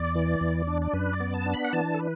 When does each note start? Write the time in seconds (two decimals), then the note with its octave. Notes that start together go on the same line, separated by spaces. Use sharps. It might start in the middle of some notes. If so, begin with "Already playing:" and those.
Already playing: E2 D5
0.15 E3
0.41 E2
0.67 D4
0.82 D5
0.93 F#2 B4
1.13 D5
1.20 B3
1.34 A5
1.46 D4
1.54 B5
1.65 F#5
1.73 E3 A5
1.94 A4
1.99 B4